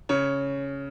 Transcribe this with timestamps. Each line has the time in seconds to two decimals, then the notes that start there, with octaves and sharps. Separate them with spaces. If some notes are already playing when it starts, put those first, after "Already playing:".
0.09 C#3 C#5